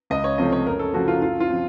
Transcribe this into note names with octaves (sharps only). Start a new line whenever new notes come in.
C#2 D#5
C#5
C3 F3 A3 C4 D#5
C#5
F#2 A#4
A4
C#3 F3 A3 F#4
F4
F#2 F4
F4
F3 C4